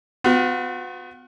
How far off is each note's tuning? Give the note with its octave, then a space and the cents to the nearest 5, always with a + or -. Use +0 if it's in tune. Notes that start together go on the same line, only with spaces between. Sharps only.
B3 +35 F#4 -45